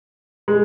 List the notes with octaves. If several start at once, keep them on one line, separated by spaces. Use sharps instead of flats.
G#3